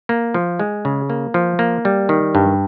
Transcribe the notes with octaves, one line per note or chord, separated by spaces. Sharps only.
A#3
F3
G#3
C#3
A#3
F3
A#3
G3
D#3
G2